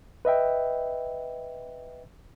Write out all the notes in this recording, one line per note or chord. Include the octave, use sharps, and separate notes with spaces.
B4 D#5 E5 G5